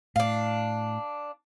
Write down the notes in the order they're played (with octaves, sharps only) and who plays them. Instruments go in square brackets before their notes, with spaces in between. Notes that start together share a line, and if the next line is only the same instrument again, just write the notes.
[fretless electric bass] A2 [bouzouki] D4 F5